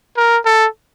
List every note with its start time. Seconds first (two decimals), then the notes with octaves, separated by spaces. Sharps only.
0.17 A#4
0.46 A4